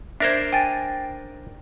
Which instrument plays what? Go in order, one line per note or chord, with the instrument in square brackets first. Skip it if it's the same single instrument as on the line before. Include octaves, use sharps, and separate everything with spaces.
[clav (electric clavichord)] D4 A#4 C5 [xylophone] E5 G#6
[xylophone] G5 G#5 A6